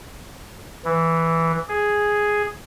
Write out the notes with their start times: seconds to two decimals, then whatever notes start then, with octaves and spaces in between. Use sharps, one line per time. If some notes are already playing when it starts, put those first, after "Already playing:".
0.85 E3
1.69 G#4